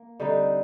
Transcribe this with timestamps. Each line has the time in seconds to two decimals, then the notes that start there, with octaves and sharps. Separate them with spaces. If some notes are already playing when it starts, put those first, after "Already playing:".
Already playing: A#3
0.20 D3 G3 C4 D#4